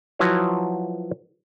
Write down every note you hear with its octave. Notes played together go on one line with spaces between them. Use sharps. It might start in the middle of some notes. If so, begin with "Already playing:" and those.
F3 F#3 E4 F#4 B4 C#5